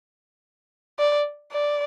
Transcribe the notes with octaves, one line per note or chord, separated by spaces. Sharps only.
D5
D5